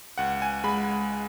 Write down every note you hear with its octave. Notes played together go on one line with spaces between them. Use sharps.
C#2 F#5
G#5
G#3 B5